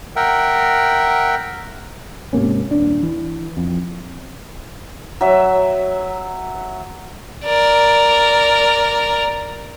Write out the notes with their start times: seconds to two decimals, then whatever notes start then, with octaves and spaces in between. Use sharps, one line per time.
0.16 A#4 E5 F#5 G5
2.33 G#2 C3 A#3 C#4
2.71 D#1 D4
3.03 E3
3.57 F2
5.21 F#3 E5
7.44 A#4 D5